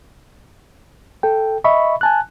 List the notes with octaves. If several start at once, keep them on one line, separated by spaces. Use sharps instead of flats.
A4 G5
D#5 E5 B5 C#6
G#5 A5 F#6